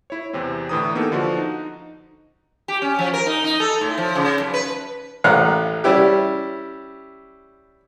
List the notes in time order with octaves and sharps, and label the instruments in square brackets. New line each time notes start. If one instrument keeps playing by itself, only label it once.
[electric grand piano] E4 C#5
E2 C3 C4
A2 D3 E3 A#5 D#6
A#3 B3 D#4 G4 A4
D3 F3 F#4
D#4
[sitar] G4
C#4
F3
A#4
D#4
D#4
A4
A2
F3
C#3
F#2
B4
[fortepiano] A1 F5 A#5 F#6
G3 C#4 E4 G4